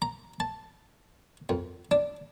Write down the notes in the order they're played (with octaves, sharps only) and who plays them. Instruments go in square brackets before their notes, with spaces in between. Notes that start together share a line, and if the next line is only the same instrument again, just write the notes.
[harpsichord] A#5
A5
F2
D4